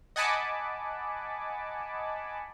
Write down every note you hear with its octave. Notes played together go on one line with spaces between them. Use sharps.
D#5 F#5 G#5 A5 B5 D6